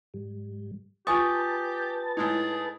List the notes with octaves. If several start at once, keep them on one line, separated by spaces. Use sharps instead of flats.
G#2 G3
F4 G4 B4 G#5 A5 C#6 D#6 A6
A2 G#3 D#4 G#4